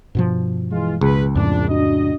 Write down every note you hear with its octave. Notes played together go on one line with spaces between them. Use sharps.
G2 B2 F3
E3 G#3 F4
C#2 G#4 B4
A#1 F2 A2 D4
D4 F#4 D#5